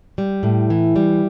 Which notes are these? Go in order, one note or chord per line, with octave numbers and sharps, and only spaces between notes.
G3
A2
E3
G3